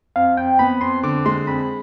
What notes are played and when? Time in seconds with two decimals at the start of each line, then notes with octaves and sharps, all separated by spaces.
0.16 F2 F5
0.37 F2 G5
0.59 B3 B5
0.81 F2 C6
1.03 D3 D6
1.26 G#3 C6
1.47 F2 B5